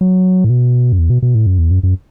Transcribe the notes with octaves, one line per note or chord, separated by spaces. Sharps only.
F#3
A2
B2
F#2
E2
B2
B2
A2
F#2
E2
F#2
F#2